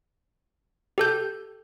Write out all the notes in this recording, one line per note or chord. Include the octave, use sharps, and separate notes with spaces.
G4 A4 G6